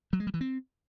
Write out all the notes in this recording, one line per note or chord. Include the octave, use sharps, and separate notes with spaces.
F#3
G#3
G3
E3
C4